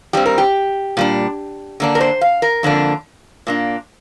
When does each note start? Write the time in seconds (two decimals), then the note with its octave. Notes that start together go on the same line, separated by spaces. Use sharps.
0.13 G2 G3 C4 G4
0.26 A#4
0.38 G4
0.97 A#2 G3 D4
1.80 D3 A#3 D4
1.95 A#4
2.01 C5
2.21 F5
2.42 A#4
2.63 F2 D3 A#3 D4
3.47 A#2 A#3 D4